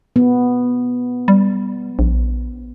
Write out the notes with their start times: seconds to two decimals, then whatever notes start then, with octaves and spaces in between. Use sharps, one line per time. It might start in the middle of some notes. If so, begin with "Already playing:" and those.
0.16 B3
1.28 G3
1.99 A#1